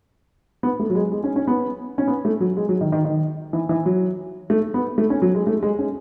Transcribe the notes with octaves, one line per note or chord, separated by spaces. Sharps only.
B3
A3
F#3
G#3
G#3
C#4
C#4
B3
C#4
B3
A3
F#3
G#3
F#3
D#3
D#3
D#3
E3
E3
F#3
A3
B3
A3
C#4
F#3
G#3
A3
G#3
C#4